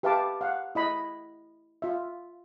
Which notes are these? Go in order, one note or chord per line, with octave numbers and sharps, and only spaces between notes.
G4 B4 E5 F5 A5 D6
F5 F#5
E4 D#5 B5
F4 E5